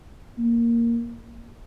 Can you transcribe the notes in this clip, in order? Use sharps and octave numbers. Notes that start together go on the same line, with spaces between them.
A#3